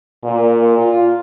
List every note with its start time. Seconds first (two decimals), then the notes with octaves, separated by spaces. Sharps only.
0.24 A#2
0.78 F4